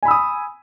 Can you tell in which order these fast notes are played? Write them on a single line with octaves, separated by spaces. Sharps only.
G#5 B5 E6 D#6